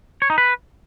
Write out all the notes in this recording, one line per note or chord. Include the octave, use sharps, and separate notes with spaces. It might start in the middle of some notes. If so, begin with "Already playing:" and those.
C#5
D#4
B4